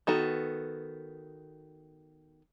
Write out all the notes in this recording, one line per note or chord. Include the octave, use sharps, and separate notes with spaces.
D#3 B3 F#4 A4